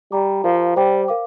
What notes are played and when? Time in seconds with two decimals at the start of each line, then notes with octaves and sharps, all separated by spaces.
0.12 G3 G4 D5 A#5 D6
0.43 F3 G4 A#4 F5 A#5
0.76 G3 C5 G5 D6
1.08 A#4 F5 D6